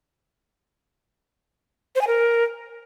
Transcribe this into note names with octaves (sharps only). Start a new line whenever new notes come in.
C5
G#5
A#4